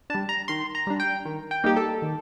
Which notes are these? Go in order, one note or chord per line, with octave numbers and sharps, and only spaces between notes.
G3 D4 A5
A#5
D#3 C6
A#5
G3 D4
G5
D#3
G5
G3 A#3 D#4 G4
A4
D#3